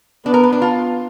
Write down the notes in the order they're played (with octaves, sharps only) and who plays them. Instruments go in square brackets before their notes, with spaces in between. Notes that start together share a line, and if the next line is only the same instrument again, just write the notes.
[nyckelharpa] B3 [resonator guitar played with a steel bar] D4
[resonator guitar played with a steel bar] A#4
B4
D4
F4